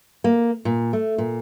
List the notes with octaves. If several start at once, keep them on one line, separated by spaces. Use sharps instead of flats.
A#3
A#2
A3
A#2